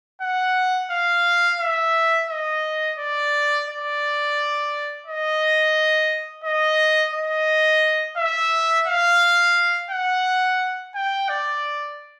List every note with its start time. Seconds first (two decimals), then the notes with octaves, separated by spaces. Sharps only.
0.22 F#5
0.91 F5
1.60 E5
2.29 D#5
2.99 D5
3.68 D5
5.07 D#5
6.44 D#5
7.14 D#5
8.17 E5
8.87 F5
9.91 F#5
10.95 G5
11.29 D5